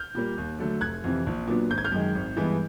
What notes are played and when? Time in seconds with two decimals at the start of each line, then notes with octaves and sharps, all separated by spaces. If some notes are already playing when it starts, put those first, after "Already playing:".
Already playing: F6 G6
0.15 A#2 G3 A#3
0.38 D#2
0.59 D3 F#3 A3
0.81 F1 F#6 G#6
1.04 F2 C3 E3
1.26 A#1
1.47 A#2 F#3 B3 D4
1.70 G#1 G6
1.78 G#6
1.84 F6 G6
1.92 F#2 D#3 G#3
2.15 G#1
2.36 G2 E3 G#3 B3